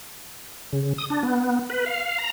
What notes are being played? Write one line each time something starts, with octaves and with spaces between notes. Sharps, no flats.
C#3
D#6
D4
B3
B4
F5
A#5